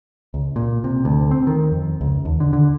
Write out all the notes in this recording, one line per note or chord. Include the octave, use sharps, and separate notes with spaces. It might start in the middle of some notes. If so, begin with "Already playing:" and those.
C#2
A#2
C3
D2
C4
D#3
F2
C#2
D#2
D3
D3